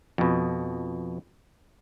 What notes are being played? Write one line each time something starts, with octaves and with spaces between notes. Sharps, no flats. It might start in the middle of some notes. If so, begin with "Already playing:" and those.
F2 B2